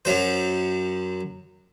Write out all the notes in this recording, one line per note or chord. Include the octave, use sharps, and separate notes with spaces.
F#2 F#3 C5